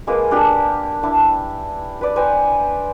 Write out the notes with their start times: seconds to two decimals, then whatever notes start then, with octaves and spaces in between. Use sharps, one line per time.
0.07 G#3 A#3 A#4 B4
0.31 D4 G4
1.03 D4 E4 A5
2.01 B4 D5
2.16 B4 C5 G5 G#5